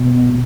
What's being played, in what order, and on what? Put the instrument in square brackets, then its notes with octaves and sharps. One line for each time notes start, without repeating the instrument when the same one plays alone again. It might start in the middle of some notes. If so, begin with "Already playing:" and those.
Already playing: [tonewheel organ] B2